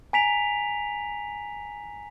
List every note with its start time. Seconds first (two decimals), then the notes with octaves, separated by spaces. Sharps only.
0.13 G#5 A#5 B6 D7 F7